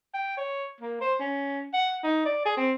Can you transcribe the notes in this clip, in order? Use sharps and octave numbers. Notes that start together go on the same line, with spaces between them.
G5
C#5
A#3
C5
C#4
F#5
D#4
D5
G#4
C4